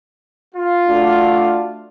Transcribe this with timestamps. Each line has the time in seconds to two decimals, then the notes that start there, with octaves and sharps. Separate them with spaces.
0.55 F4
0.89 A3 D4 F#4